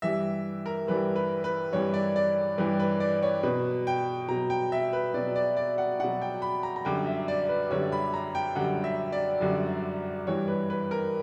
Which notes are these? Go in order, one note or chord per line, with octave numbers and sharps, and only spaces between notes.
G2 E3 G3 E5
A#4
G2 E3 G3 B4
B4
B4
G2 E3 G3 C#5
D5
D5
G2 E3 G3 B4
B4
D5
C#5
B2 F#3 B4
G5
B2 F#3 A#5
G5
E5
B4
B2 F#3 D5
D5
D5
F#5
B2 F#3 F#5
G5
B5
A#5
A#5
F#2 D3 G3 G5
E5
D5
B4
F#2 D3 G3 C#5
B5
A#5
G5
F#2 D3 G3 F#5
E5
D5
F#2 D3 G3
G2 E3 G3 C#5
B4
B4
A#4